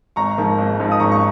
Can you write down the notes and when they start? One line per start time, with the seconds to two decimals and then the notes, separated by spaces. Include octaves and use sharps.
0.16 G#1 A#5 C#6
0.38 G#2 F3 A#3 D#4
0.58 G#1
0.80 G#2 F3 A#3 D#4
0.91 D#6
1.00 G#1 A#5 C#6
1.12 C#6